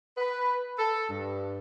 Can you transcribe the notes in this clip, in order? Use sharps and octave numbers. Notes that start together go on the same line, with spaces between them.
B4
A4
G2